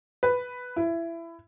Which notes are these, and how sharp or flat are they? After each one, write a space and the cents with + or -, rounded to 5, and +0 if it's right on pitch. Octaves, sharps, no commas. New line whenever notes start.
B4 +5
E4 +20